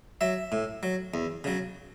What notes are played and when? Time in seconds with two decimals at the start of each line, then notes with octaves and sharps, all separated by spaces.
0.21 F#3 E5
0.52 A2
0.83 F#3
1.14 E2
1.44 C#3 F#3